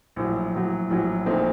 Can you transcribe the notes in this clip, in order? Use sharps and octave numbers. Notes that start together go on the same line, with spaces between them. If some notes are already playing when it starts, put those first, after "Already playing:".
A#1 A2 F#3
A#1 A2 F#3
A#1 A2 F#3
A#1 A#2 A3 C4 D#4